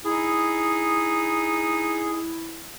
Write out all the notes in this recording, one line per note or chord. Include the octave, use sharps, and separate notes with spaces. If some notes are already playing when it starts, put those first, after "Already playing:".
D#4 E4 G#4